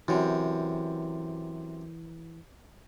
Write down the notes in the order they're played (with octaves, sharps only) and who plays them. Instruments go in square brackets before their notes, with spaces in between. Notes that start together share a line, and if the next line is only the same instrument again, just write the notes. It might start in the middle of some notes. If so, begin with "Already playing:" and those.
[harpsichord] F#2 C3 [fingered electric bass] E3